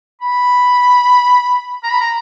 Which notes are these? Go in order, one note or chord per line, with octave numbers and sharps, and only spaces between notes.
B5
A#5
B5
A#5